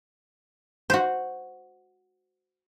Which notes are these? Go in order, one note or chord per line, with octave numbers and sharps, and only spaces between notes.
F#4 C5